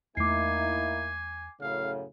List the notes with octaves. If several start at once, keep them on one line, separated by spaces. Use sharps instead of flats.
E2 A3 A#3 D#4 E4 G#5 D6 C7
F#2 A2 C#3 F5